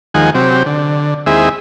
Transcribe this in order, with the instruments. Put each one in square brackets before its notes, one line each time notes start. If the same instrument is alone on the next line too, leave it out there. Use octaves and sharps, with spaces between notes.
[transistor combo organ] D#2 D#3 F3 G#3 F#5 G#5
C3 F#3 C4 G4
D3
D#2 G#3 C4 E4 G#4 E5